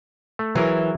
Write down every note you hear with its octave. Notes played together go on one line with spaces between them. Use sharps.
A3
E3 F#3 G#4 A#4